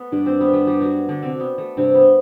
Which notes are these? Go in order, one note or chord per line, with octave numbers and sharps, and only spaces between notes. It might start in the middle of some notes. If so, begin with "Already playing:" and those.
Already playing: A3 B3 A4 B4
G2 D4 D5
C4 C5
B3 B4
A3 A4
G3 G4
F#3 F#4
D3 D4
C3 C4
B3
A3
G2 C3 C4
B3